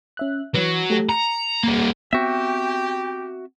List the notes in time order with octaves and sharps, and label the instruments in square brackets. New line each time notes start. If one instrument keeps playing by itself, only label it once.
[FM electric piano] C#4 E5 F#6
[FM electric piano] E3 B4 [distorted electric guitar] F#3
[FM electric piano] A3 G4 A4
[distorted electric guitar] A#5 [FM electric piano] C#7
[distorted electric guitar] G3 A#3
[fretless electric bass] B3 C4 [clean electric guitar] F#4 E5 [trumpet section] G4 [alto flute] G5